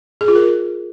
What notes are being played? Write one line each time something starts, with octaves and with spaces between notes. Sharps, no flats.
G#4
F4
A#4